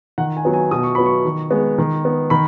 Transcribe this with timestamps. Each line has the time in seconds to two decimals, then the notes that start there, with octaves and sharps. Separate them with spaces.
0.18 D#3 F#5
0.37 G#5
0.45 F#3 B3
0.53 G#5
0.71 B2 D#6
0.83 C#6
0.95 F#3 B3 B5
1.06 C#6
1.25 D#3
1.51 G#3 B3
1.78 D#3
2.05 B3
2.30 D#3 B5